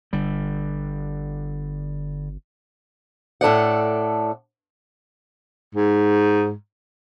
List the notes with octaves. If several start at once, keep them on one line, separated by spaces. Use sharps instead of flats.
G1 D3 G3
A2 A4 D5 F#5
G#2